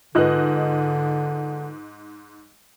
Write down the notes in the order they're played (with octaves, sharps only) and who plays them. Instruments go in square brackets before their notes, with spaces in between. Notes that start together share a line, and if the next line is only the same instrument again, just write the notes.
[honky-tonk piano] G#2 D#5 F#6 [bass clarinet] D3 [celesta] F4 B4